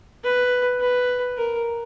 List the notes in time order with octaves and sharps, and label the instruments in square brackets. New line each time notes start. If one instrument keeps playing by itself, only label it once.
[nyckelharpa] B4
B4
A#4